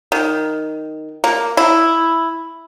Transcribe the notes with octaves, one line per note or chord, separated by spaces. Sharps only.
D#3
A#3
E4